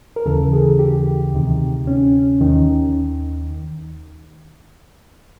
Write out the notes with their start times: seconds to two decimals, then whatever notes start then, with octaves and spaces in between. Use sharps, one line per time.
0.16 A#4
0.26 D#2 C#3 E3 A4
0.53 G#4
0.79 G4
1.34 D2 C3 D#3
1.87 C#4
2.41 D#2 D#3